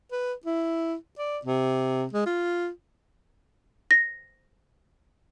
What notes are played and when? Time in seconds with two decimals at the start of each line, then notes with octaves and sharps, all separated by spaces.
0.12 B4
0.46 E4
1.19 D5
1.45 C3
2.13 G#3
2.26 F4
3.91 A#6